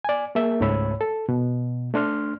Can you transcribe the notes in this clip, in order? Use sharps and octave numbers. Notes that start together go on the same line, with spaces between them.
D5 G#5
A#3 G#4 A#4 E5
C#2 G#2 A3 C#5 B5 E6
A4
B2
A3 D4 C6 F6